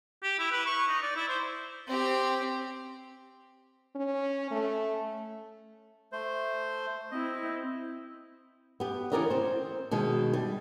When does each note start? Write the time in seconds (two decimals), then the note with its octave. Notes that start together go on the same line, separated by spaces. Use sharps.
0.23 G4
0.39 E4
0.51 B4
0.66 C#6
0.88 D#4
1.02 D5
1.16 E4
1.29 C5
1.87 C4 G4
3.96 C#4
4.51 A3
6.12 A3 C5
7.11 C4 E4 D#5
8.80 B3 G4
9.12 E3 C#4 G4 A#4 D5 D#5
9.30 C4 C5
9.91 B2 D#3 G#3
10.33 G3